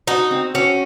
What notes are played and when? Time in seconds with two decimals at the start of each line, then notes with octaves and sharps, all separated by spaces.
0.07 D#4 F#4
0.31 C4
0.54 C#4 F#4